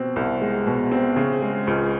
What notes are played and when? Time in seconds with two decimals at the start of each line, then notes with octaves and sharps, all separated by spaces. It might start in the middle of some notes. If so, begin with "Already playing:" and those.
Already playing: B2 C4
0.16 C2
0.41 G#3
0.67 B2
0.92 C4
1.16 C#3
1.42 G#3
1.67 C#2